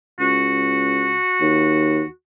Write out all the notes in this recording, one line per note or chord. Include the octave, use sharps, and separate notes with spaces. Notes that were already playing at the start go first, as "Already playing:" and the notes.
C#2 F#4
D#2